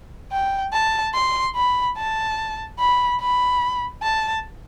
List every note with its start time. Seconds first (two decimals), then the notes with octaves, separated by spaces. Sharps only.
0.32 G5
0.73 A5
1.15 C6
1.56 B5
1.97 A5
2.79 B5
3.21 B5
4.03 A5